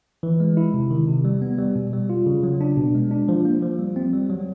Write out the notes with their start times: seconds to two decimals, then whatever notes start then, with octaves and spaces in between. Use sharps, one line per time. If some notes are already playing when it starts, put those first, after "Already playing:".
0.23 E3
0.40 G#3
0.57 E4
0.74 C3
0.91 D#3
1.08 C3
1.25 G3
1.42 B3
1.59 G3
1.75 B2
1.93 G3
2.10 F4
2.26 C#3
2.43 F#3
2.61 D4
2.77 B2
2.95 G#3
3.11 D4
3.28 F3
3.45 A#3
3.62 F3
3.79 G3
3.96 C4
4.13 G3
4.30 F#3